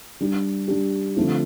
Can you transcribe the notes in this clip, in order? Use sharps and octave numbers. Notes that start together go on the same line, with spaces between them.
G3 D4 G4
G3 D4 G4
D3 F3 A3 C4 F4